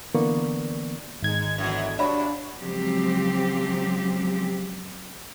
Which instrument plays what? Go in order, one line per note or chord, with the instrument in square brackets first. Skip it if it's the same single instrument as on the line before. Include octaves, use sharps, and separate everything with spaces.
[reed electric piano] D3 E3 A#3 B3 D5 C#6
[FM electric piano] G#1 G#6 [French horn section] G#3 D#4
[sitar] F#2 E3 [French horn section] B2 D3 E4
[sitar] G2 F#4 E5 [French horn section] D4 [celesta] C#5 D5 B5
[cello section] C#3 F3 F#3 G#3 C4 G4